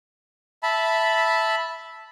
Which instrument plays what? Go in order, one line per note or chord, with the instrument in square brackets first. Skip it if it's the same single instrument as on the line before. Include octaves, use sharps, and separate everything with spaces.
[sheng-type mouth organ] E5 A5 B5